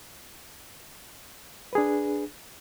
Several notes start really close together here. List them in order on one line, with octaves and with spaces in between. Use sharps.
B4 G#4 D4